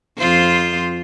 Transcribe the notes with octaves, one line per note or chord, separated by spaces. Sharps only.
F2 F4 C5